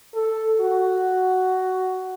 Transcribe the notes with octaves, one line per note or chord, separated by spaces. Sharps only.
A4
F#4